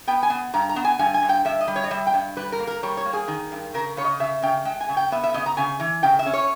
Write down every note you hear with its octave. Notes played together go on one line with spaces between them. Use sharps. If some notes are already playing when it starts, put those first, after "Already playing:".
B3 G5
G#5
B3
G2 A#5
A#5
B3
G#5
G2 G#5
G#5
G2
G5
G2 E5
D#5
G3
C#5
D#5
G3 E5
G5
G2
G3 B4
A#4
A#3
A#4
G3 C#5
C#5
A#3
G#4
D#3
G2
C#3 A#4
C#3 C#5
D#5
C#3 E5
C#3 G5
G#3 G5
G#5
C#3
G5
B3 E5
E5
C#3 D#5
A#5
C#3 G#5
E3
C#3 G5
E5
C#4
C#5